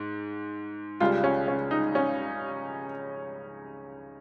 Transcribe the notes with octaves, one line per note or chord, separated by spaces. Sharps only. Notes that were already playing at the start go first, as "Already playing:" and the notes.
Already playing: G#2
C#2 C#3 G3 F4
C#4
C#4
D#4
C#4